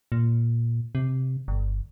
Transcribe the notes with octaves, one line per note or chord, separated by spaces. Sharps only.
A#2
C3
G1